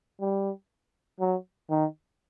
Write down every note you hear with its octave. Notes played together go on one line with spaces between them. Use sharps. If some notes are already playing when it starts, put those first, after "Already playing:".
G3
F#3
D#3